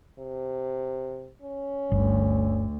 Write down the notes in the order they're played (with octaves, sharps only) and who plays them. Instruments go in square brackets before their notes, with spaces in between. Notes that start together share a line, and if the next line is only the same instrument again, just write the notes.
[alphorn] C3
C#4
[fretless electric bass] G1 [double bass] D2